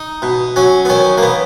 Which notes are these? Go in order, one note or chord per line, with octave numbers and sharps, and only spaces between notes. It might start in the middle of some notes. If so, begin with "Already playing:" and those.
Already playing: D#4
B2
F#3 C#4
B3
D#3 C#4
A#3
B3